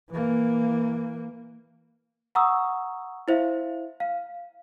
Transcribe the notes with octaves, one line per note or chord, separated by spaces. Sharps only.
E3 A#3
F#5 A#5 C#6 D#6 E6
E4 C5 E5 F5
F5